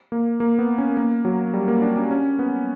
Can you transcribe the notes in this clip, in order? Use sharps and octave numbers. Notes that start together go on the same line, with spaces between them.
A#3
A#3
B3
C#4
A#3
F#3
G3
A#3
D4
C#4
C#4
B3